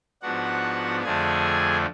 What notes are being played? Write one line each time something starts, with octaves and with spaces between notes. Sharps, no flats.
G#2 F3 B3 D4 F#4 F#5
F2 D3 F3 A3 D4 G#4 G#5